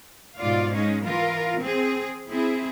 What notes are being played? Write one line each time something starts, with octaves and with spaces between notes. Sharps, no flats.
G#2 B2 F4 D5 F5
G#3 C#4 D#4
E3 F4 A#4
C4 G#4
C4 E4 G#4